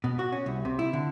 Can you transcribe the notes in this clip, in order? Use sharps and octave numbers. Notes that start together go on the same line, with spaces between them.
B2
F#4
C#4
C2
C3
E4
D3